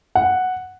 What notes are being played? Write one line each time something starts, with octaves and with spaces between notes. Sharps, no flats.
F#5